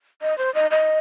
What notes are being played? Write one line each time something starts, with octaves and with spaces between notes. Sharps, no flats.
D#5
C5
D#5
D#5